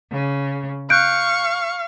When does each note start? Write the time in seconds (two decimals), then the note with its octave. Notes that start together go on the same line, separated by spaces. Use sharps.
0.11 C#3
0.90 F5 C#6 F#6 G6 D7